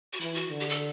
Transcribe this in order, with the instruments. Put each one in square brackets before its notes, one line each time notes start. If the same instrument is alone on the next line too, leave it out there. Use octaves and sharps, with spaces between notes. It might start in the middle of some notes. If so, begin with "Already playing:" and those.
[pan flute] F#4
[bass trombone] E3 [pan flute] E4
[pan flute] F#4
[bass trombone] D3
[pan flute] G4
A4